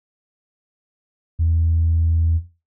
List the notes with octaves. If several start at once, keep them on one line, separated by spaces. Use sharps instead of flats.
E2